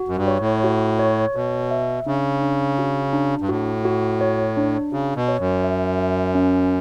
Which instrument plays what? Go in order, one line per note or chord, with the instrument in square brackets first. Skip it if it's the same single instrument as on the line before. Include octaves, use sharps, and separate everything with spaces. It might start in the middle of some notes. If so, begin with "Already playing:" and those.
Already playing: [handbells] F#4
[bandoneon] F#2
G2
[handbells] C#5
[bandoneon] A2
[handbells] F#4
C#5
[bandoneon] B2 [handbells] C#5
[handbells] E5
[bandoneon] C#3 [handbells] D4
[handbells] D4
F#4
D4
[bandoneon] G2
[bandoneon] A2 [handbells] F#4
[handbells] F#4
C#5
D4
[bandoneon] C#3 [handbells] F#4
[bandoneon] B2
[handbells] C#5
[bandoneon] F#2
[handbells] E5
E5
C#4